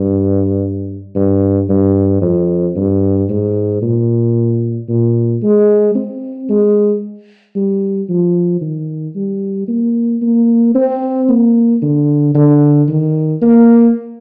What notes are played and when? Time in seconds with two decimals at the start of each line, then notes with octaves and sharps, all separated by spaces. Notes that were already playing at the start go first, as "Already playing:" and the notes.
Already playing: G2
1.16 G2
1.69 G2
2.22 F2
2.76 G2
3.30 G#2
3.82 A#2
4.88 A#2
5.43 G#3
5.95 C4
6.49 G#3
7.56 G3
8.09 F3
8.62 D#3
9.16 G3
9.68 A#3
10.22 A#3
10.75 C4
11.29 A#3
11.82 D3
12.35 D3
12.89 D#3
13.42 A#3